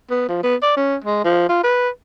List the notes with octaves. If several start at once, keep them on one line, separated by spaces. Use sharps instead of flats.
B3
F3
B3
D5
C#4
G#3
F3
F4
B4